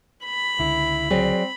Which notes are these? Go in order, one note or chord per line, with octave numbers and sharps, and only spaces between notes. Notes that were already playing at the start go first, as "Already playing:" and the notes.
B5
C#2 D3 E4
F#3 C4 G#4 D5